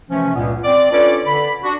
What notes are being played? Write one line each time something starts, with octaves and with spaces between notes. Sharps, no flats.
C3 E3 F3 A3 C#4
C#2 G2 A#2 B3
C4 D5
C#4 D4 F4 A4 B4 D5
D3 B5
D4 F#4